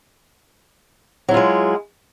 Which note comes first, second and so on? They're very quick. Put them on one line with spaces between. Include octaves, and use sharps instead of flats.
F#3 E4 F4 G#3